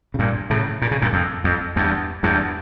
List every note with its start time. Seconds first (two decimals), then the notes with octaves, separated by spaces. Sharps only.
0.14 C#3
0.19 G2 A#2
0.50 A2 C#3
0.82 A#2
0.91 C#3
1.02 G2 A#2
1.13 F2
1.44 F2
1.76 E2 G2
2.23 E2 G2